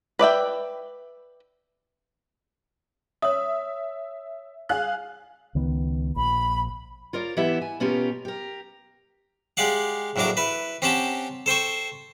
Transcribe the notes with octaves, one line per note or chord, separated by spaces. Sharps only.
B4 D5 E5 G5
C#5 E5 D#6
G#4 F5 F#6
C#2 D#3 B3
A#1 B5
F4 A#4 C#5 D5
E3 B3 E4 G4 E5
G#5
B2 B3 C#4 F4 G4 A#4
G4 A#4
G#3 G4 D5 F5 F#5
A#1 A2 F#3 D4 A#4 D6
E4 B4
C4 C#4 G4 F#5 G5 A5
A4 C5 G5 C#6